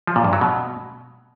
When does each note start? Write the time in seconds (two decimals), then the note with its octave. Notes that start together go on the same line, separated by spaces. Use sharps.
0.07 F3
0.16 A#2
0.24 G2
0.33 F#3
0.41 B2